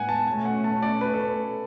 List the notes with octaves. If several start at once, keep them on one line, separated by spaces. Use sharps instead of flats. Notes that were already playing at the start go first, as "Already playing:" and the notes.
Already playing: A2 G#3 B3 F#5 G#5
A5
B2 A3 C#4 G#5
F#5
A5
D5
B4
A4
B4